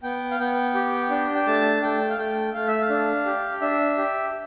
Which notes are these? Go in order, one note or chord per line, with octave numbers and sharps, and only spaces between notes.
B3 G5
F5
B3 G5
G4
D4
G5
A3 A5
A3 G5
F5
A3 G5
A3 F5
E5
F5
D4
G4
D4 E5
G4